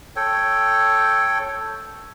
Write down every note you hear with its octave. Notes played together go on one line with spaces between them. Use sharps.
A4 C#5 G5